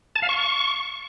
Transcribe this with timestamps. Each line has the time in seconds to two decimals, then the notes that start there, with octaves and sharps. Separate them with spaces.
0.16 A5
0.22 F5
0.29 C#6